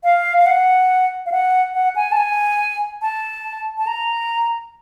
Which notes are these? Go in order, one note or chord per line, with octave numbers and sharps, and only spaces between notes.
F5
F5
F#5
F5
F#5
F#5
G#5
A5
G#5
A5
A5
A#5